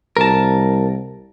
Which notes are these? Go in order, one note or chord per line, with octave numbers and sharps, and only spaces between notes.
C2 A#4 A5